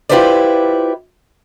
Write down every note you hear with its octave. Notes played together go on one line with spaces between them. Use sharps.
E4 F4 G4 B4 C5 D5